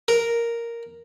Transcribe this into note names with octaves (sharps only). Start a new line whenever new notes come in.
A#4